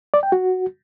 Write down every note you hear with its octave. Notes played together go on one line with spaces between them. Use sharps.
D5
G5
F#4